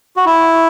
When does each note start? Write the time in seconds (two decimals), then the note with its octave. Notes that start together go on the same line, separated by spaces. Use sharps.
0.17 F#4
0.26 E4